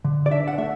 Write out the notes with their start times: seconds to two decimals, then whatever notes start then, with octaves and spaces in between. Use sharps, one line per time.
0.04 D3
0.26 D5
0.31 D4 E5
0.48 F#5
0.58 A3 E5